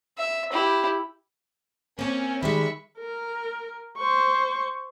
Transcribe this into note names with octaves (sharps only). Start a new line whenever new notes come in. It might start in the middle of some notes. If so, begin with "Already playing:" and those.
E5
E4 G4
A#3 C4 C#4
D#3 G3 G#3 E5 B5 C#6
A#4
C5 C#6